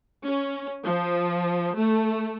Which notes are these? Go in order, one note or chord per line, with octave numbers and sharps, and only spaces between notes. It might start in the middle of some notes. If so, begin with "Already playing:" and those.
C#4
F3
A3